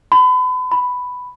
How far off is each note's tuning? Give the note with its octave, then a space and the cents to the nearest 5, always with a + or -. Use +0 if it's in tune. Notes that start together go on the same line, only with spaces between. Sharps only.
B5 +35
B5 +5